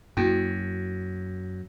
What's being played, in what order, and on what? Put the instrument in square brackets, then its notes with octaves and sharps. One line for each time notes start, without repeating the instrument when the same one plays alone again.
[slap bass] F#2 [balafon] A#3 E4 F#4